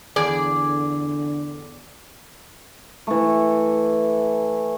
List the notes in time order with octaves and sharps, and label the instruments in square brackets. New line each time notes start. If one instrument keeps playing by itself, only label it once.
[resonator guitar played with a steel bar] E2 G#4 D5 [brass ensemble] D3
[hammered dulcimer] E3 A3